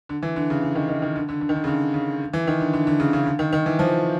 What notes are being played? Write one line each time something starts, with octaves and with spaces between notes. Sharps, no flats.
D3
E3
D3
C#3
D3
D#3
D#3
D#3
D3
D3
D3
D#3
D3
C#3
D3
C#3
E3
D#3
D3
D3
D3
C#3
C#3
D3
D#3
D#3
E3
F3